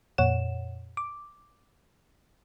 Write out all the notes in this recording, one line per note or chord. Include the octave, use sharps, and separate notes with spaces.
F2 A#2 C#5 F#5 E7
D6